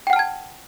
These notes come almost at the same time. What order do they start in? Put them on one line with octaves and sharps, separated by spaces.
G5 F#5 F6 A5 G#6